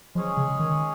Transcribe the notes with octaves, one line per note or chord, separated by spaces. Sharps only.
F3 G#3 C#4 G#4 C#5
C#3
D#3